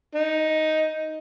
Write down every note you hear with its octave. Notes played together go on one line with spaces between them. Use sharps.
D#4